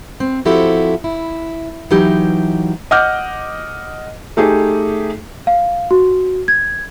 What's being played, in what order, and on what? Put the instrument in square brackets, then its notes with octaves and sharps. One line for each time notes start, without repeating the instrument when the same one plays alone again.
[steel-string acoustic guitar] C4
F3 C4 E4 F#4 G4 A4
E4
E3 F#3 D#4 G4
[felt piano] D#5 F#5 D6 F6 G6
A3 D#4 G4 G#4
[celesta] F5
F#4
G#6